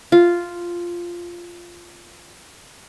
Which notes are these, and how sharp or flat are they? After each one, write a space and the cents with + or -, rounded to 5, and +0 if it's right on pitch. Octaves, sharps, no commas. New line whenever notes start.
F4 -5